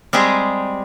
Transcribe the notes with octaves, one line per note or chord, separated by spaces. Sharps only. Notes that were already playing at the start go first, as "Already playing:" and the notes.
G3 G#3 C4 G4 G#4 A#5